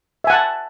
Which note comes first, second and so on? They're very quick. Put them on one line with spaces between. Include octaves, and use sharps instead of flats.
E5 G#5 F#5 A5